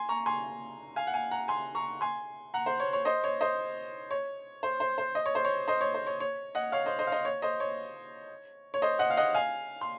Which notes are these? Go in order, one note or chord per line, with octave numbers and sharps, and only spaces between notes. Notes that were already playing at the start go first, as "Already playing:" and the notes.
Already playing: G#5 C6
A#5 C#6
G#5 C6
F5 G#5
F#5
F5 G#5
F#5 A#5
G#5 C6
A#5 C#6
G#5 C6
F#5 A#5
C5
C#5
C#5
C5 D#5
C#5
C5 D#5
C#5
C5
C5
C5
D#5
C#5
C5
C#5
C5 D#5
C#5
C5
C#5
C#5
D#5 F#5
C#5 F5
C5 D#5
C5 D#5
F5
C5 D#5
C#5
C5 D#5
C#5
C#5
C5 D#5
D#5 F#5
F5
D#5 F#5
F5 G#5
C6